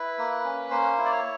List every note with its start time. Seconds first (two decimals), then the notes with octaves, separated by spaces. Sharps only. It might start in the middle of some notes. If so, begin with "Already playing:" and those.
Already playing: E4 B4
0.18 A#3
0.45 C#4
0.71 A#3 C5
0.98 E4
1.05 D5
1.11 C#5